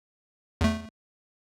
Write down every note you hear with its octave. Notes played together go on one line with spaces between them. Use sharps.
E2 A3